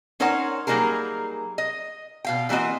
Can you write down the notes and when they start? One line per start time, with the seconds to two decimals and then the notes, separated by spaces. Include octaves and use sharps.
0.20 C#4 D#4 A#4 C5 C#5 F#5
0.67 F#3 G3 A#3 D#4 G#4 A#4
1.58 D#5
2.25 B2 F5 G5
2.49 E3 G3 A#3 C4 F#4 D#5